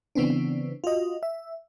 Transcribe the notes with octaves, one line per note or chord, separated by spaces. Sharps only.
C#3 E3 B3 C4 D4
F4 F#4 D#5
E5